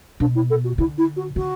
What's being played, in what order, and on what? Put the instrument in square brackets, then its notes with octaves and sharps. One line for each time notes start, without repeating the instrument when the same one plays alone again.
[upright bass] B2 [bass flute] D4
[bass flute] E4
A4
F#4
[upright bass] D3 [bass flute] E4
[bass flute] E4
F#4
[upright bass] D3 [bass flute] F#4